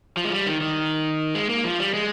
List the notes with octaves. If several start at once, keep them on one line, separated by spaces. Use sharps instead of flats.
F3
G#3
G3
D#3
D#3
G#3
A#3
F3
G3
G#3